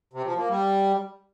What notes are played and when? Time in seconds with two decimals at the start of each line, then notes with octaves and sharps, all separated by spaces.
0.13 C3
0.25 F3
0.37 A#3
0.49 G3